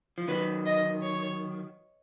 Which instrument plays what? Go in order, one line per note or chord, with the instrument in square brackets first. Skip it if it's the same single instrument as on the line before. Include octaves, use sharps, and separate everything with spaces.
[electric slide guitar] F3
[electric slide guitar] D#3 F#3 [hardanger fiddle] B4
[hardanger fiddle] D#5
C#5